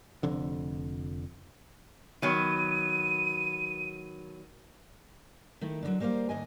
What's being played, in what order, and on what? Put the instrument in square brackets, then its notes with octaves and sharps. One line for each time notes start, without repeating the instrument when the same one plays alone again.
[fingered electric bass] F1 F2 D3
[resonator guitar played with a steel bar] D#3 F#3 B3 [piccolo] D#7
[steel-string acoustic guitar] D#3 A3 E4
D3 D#3 F#3
G3 A#3 C5 C#5 F5
D#2 A2 D#3 D#5 G#5